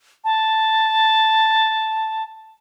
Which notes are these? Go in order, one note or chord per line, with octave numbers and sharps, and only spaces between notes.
A5